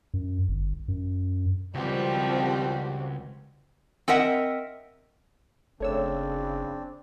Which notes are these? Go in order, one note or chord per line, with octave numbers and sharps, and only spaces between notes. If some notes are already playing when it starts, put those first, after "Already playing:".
F#2
G1
F#2
C#2 D#3 F3 G3 C4 F#4 G4
C4 A#4 D#5 E5 F#5
F#1 C#3 A3 C4 D4 C#5 E6